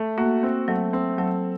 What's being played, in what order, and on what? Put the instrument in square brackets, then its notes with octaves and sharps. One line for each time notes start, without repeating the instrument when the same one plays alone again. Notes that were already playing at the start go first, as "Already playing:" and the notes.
Already playing: [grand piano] A3
[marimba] A#3 [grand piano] F#4
[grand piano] C4
[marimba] F#3 [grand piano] A3
[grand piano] C4
[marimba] F#3 [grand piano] A4